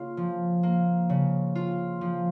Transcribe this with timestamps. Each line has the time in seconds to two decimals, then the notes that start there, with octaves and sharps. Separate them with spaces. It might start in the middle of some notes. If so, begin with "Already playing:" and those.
Already playing: C#3 A#3 F4
0.17 F3
0.63 A#3
1.09 C#3
1.55 F4
2.01 F3